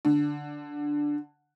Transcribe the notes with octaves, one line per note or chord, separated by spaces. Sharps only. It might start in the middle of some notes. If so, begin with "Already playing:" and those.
D3